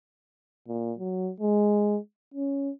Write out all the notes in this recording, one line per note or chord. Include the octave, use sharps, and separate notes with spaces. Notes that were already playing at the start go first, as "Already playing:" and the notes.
A#2
F#3
G#3
C#4